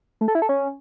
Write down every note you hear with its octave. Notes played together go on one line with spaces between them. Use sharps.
A3
A4
E4
A4
C#4